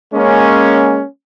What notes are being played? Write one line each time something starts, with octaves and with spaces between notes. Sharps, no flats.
G#3 A#3 C#4